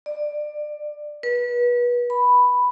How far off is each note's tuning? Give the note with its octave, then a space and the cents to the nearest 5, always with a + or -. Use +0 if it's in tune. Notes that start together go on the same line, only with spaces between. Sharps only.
D5 +20
B4 -30
B5 +5